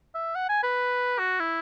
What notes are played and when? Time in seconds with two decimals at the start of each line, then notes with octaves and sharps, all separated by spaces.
0.14 E5
0.35 F#5
0.49 G#5
0.63 B4
1.18 F#4
1.39 E4